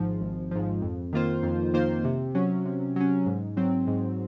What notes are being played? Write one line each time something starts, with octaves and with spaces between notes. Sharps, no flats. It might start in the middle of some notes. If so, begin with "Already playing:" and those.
Already playing: G#1 G#2 F3
G#1
G#2 F3
F2
D#3 A#3 F4 C5
F2
D#3 A#3 F4 C5
C3
F#3 C#4
C3
F#3 C#4
G#2
F#3 C4
G#2